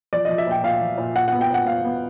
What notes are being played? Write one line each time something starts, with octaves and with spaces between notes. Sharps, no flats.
F3 D5
F3 D#5
E5
A#2 G5
A#2 F5
F3
A#2
A#2 F#5
B3 F#5
G5
A#2 F#5
B3 F5
B3